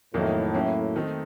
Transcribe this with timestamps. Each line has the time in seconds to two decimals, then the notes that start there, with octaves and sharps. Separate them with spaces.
0.14 F2 A2 D#3 F#3 A#3 D#4
0.54 F#3 A#3 C#4
0.96 D#3 A3 C4 D#4